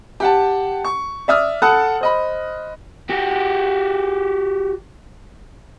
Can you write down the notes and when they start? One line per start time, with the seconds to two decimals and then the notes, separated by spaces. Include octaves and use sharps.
0.20 G4 F#5 A5
0.84 C#6
1.28 D5 E5 D#6 F6
1.62 A4 F#5 A5 B5 D#6 F#6
2.01 C5 D#5 B5
3.09 F#4 G4